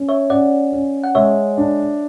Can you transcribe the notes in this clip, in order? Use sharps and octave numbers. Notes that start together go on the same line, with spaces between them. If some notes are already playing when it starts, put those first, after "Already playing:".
Already playing: C#4
C#5 E5
C#4 D5 F#5
C#4
F#5
G#3 C#5 E5
D4